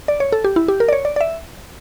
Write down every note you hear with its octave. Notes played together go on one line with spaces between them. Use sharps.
D5
C#5
A4
G4
E4
G4
A#4
D5
C#5
D5
D5
E5